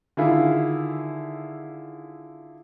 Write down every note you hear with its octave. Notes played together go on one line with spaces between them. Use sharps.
D3 D#3 E4 F4 G#4